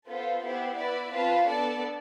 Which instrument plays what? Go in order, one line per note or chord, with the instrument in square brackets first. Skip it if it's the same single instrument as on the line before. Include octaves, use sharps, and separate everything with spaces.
[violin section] B3 F4 A4 C5
B3 E4 G4 C5
E4 B4 D5
C4 F4 B4 F5 A5
B3 D4 A4 D5 A5